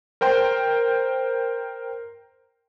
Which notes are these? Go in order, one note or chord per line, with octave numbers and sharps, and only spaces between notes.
A#4 C5 G5 C6